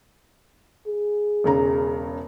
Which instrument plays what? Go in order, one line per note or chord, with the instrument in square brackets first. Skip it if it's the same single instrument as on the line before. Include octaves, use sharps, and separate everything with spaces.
[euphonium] G#4
[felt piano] E1 C#3 A#5